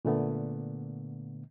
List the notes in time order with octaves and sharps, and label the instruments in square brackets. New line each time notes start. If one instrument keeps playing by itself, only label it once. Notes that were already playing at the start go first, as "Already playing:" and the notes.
[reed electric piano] A#2 D3 A3 B3